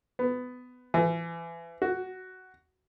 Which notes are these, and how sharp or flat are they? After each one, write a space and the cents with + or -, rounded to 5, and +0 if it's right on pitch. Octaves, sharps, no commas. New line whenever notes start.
B3 +15
E3 +30
F#4 +10